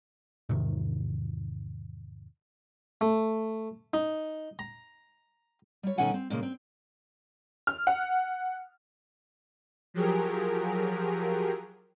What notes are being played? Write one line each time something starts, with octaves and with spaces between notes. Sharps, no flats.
E2 G#2 C3 D#3
A3
D#4
A#5
G3 C#5
B2 D#3 C#4 A4 F#5 G#5
C4
A#2 C#3 G#3 A#3
C4
F6
F#5
F3 F#3 G4 G#4 A#4